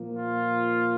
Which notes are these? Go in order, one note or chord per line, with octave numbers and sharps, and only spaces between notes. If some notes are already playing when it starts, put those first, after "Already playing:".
Already playing: A#2 F3 A#3
F4